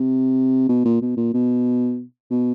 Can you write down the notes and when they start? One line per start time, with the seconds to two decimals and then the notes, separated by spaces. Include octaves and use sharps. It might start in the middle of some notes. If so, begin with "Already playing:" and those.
Already playing: C3
0.69 B2
0.85 A#2
1.01 B2
1.17 A#2
1.34 B2
2.31 B2